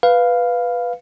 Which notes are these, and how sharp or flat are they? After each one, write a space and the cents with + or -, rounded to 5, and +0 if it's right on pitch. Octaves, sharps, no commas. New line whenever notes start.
B4 +0 F5 +0